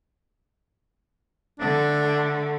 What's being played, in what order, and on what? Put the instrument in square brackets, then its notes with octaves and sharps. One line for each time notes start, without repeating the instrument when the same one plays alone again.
[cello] D3 A3 [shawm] D4